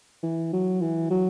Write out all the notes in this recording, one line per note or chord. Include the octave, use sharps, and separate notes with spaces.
E3
F#3
E3
F#3